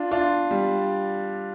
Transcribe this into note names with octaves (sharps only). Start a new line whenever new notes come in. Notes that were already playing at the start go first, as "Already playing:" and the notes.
Already playing: D4 F4
D4 F4
G3